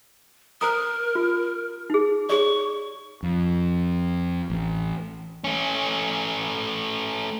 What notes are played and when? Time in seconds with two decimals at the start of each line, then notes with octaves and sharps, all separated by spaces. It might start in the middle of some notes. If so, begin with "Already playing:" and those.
0.61 A#4 C5 A#5 D#6
1.15 F4
1.90 D#4 G#4
2.29 G#4 C#5 D5 C#6
3.23 F2
4.50 A1
5.44 A3 C#4